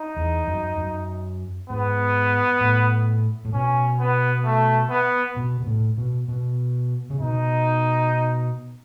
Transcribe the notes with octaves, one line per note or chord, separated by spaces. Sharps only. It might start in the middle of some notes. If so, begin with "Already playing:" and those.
Already playing: D#4
E2
F#2
F#2
G#2 B3
A2
A2
B2 C#4
B3
A3
B3
B2
B2
A2
B2
B2
C#3
B2 D#4